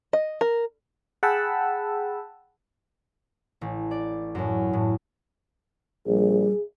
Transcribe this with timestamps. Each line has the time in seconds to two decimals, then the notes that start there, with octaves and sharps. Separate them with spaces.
0.13 D#5
0.41 A#4
1.23 G#4 F#5 G5 A5 B5 E6
3.61 A1
3.91 D5
4.35 F#2 A2
4.73 A2
6.07 A#1 G3 G#4